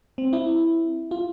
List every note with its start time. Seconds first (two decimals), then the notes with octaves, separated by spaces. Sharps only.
0.18 C4
0.33 E4
1.11 F4